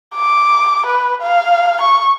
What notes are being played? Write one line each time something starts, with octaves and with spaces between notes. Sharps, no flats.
D6
B4
F5
C#6